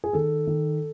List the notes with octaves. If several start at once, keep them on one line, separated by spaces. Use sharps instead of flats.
G#4
D#3 A4
D#3